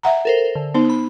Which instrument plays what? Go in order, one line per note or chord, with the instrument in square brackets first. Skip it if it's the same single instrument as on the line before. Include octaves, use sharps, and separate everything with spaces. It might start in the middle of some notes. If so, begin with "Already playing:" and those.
[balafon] E5 F#5 A#5
[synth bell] A4 A#4 C5
D3
[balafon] B3 D#4 [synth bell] C5
[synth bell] B5